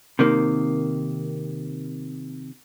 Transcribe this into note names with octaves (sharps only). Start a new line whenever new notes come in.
C3 D#3 A#3